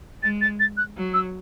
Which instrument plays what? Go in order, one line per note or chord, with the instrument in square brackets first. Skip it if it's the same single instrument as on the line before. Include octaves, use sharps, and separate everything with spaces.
[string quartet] G#3 [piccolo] A6
[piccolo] A6
A6
F#6
[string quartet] F#3
[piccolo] E6